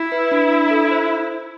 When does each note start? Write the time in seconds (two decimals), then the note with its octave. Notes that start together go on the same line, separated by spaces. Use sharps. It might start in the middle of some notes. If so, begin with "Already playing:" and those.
Already playing: E4
0.12 B4
0.31 D4
0.51 D4
0.71 A4
0.91 C5